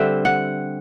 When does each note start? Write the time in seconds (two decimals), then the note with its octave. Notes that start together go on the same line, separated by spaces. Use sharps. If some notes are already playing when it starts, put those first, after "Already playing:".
Already playing: D3 G3 C4 E5
0.25 F#5